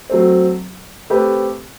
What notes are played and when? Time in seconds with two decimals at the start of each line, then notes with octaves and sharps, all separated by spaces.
0.10 F#3 A3 C4
1.10 A3 C4 G4 B4